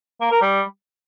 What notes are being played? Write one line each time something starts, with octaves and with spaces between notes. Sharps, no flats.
A#3
A#4
G3